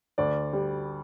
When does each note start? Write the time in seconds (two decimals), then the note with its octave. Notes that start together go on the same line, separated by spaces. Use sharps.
0.18 D2 D5
0.53 G3